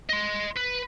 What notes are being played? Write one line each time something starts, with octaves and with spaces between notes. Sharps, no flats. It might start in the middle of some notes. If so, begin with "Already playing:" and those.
D#5 C6
B4